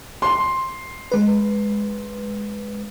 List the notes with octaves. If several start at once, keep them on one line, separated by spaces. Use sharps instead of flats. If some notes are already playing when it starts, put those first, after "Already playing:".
C6
G#3 B4